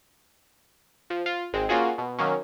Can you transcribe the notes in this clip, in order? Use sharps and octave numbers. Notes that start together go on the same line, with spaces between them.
F3
F4
G#1 G#3 C4
A#3 C#4 F4 F#4 G#4
B2
D#3 F#3 A#3 C#4